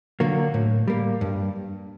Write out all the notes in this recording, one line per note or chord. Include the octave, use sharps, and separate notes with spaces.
D3 F#3 A#3 F#4
A2
G3 A#3
G2